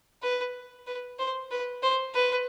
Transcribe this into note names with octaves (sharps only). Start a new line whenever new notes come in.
B4
B4
C5
B4
C5
B4